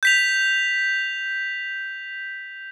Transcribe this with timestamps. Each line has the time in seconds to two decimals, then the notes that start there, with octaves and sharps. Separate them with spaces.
0.03 G6 B6 F7